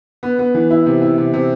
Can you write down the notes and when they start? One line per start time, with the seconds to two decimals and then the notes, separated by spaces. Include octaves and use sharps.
0.23 B3
0.39 B3
0.54 E3
0.70 E4
0.86 C3
1.02 E4
1.18 C3
1.33 C3